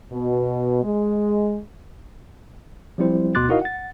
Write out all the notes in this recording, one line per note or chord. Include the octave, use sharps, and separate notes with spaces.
B2
G#3
F3 G3 C4 E4 C5
D2 B2 C6 D6 F#6 A6
D#4 E4 F#4 A#4 D#5 F5
F#5 A6